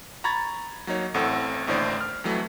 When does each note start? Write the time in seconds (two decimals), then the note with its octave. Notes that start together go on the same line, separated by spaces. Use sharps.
0.24 A#5 B5 C#6 G#6 A6
0.87 F#3 A#3 D#4 C#5
1.14 A1 A2 C4 A4 F#5
1.67 A1 D#2 A2 D3 C5 D5
2.01 F6
2.24 F2 E3 F#3 A3